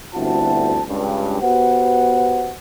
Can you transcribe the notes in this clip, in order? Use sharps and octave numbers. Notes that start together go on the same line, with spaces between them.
G1 D2 C4 E4 F#4 A5
C#2 G2
B3 F#4 G4 B4 C5 F#5